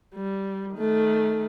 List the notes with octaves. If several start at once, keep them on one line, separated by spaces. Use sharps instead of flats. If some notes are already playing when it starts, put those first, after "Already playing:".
G3
D#3 A3